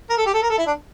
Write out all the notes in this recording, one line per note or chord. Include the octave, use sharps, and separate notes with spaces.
A#4
A4
G4
A4
A#4
A4
E4
D4